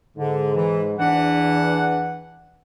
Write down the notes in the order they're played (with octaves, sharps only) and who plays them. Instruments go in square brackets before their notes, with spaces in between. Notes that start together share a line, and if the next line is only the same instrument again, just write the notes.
[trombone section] G#2 [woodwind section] D3
[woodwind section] E3
[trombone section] E2 D4 [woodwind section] E3 F#5